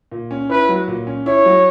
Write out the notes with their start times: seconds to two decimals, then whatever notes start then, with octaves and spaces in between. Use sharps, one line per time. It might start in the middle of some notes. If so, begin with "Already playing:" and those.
0.12 A#2
0.31 C#4
0.50 E4 B4
0.69 F#3
0.88 A#2
1.07 C#4
1.26 E4 C#5
1.45 F#3